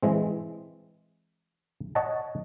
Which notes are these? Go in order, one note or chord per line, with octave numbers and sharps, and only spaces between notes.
E3 G#3 C4
C#5 D#5 F#5 A5